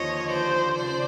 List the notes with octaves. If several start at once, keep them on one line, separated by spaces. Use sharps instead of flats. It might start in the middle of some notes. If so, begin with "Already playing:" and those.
Already playing: D#2 D3 F3 C#5 D#5
C5 D5
C#3 F3 C5 D5